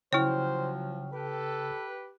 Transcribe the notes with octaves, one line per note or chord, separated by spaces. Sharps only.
C#3 F3 F#3 E4 C5 C#5 G5 F6
G4 A4 B4